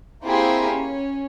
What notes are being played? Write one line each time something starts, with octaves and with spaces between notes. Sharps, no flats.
A#3 C4 E4 F4 G4 G#4
C#4